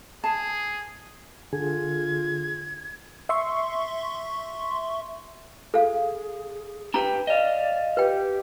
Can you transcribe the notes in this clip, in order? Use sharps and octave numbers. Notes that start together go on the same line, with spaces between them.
G#4 A5
D3 F4 G#4 G#6
E5 C6 C#6
G#4 A4 F5
D4 G4 B4 G5 A#5
D5 D#5 F5
G4 B4 G5